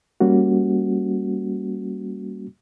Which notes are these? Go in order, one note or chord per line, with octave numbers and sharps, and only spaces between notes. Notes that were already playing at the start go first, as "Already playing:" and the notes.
G3 A#3 C#4 F#4